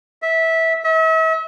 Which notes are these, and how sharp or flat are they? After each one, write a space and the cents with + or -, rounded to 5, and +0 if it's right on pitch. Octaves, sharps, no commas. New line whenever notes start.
E5 -15
E5 -40